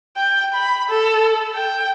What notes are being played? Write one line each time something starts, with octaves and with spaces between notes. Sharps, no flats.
G5
B5
A4
G5